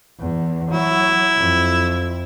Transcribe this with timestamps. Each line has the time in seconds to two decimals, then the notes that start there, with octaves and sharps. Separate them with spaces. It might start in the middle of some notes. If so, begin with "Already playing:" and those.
0.19 E2
0.71 F#3 E4
1.37 F2